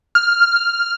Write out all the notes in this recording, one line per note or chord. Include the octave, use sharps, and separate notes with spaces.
F6